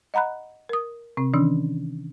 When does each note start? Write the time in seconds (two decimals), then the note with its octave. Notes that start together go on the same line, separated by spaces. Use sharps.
0.14 D#5 F#5 A#5 B5 F#6
0.69 A#4 D#6
1.17 C3 C4
1.34 D#3 E3 C#4 D4